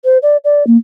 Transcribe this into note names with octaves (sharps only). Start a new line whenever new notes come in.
C5
D5
D5
A#3